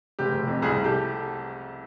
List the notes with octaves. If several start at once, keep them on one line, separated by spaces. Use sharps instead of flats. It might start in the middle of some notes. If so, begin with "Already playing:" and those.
F1 G4
F1
F2
C2 G#4
C2
G4 A4